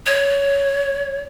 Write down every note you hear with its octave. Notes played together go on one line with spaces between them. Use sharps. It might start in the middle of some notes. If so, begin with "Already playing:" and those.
C#5